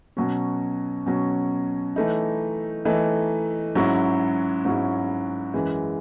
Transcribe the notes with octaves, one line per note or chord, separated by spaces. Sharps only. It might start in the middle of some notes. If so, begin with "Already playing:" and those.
B2 F#3 C#4
B2 F#3 C#4
E3 A3 D#4
E3 A3 D#4
G#2 F#3 C#4 E4
G#2 F#3 C#4 E4
F#2 E3 G#3